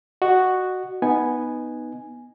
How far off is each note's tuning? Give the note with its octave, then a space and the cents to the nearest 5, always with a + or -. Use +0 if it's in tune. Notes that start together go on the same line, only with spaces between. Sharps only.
F#4 +0 D#5 -35
B3 +0 D#4 +0 G#5 +0